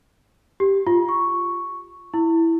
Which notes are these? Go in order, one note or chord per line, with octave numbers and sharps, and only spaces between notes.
G4
F4
C#6
E4